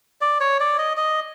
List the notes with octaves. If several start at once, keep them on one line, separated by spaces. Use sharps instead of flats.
D5
C#5
D5
D#5
D#5